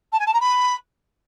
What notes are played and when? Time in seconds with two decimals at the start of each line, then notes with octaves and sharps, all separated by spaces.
0.12 A5
0.19 G#5
0.26 A5
0.33 A#5
0.40 B5